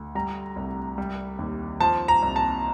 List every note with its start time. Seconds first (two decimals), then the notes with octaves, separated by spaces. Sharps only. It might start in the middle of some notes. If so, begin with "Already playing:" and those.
Already playing: D2
0.15 G3 A#5
0.56 C2
0.98 G3
1.39 D#2
1.80 F3 A5
2.08 A#5
2.22 C2
2.36 A5